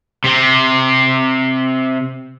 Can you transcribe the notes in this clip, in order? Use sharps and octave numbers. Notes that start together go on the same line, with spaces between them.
C3 C4